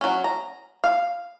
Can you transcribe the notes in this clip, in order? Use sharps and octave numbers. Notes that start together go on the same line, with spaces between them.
F#3 C#4
A#5
F5